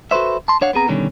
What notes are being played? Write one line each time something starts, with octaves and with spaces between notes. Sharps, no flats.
F#4 A4 B4 C5 E5
A5 C6
D4 C#5 F5 F#5
B3 C4 G#4 A#5
B2 D3 D#3 G3 C#4